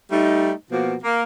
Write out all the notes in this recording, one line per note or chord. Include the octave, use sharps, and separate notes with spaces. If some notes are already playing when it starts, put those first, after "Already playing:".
G3 A3 D#4
B2 F3 A#3 F#4
A#3